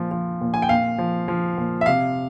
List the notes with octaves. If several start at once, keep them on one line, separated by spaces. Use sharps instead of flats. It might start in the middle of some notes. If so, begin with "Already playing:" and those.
Already playing: A#2 F3
F3
A#2
G#5
G5
A#2 F5
F3
F3
A#2
E5
C3 F5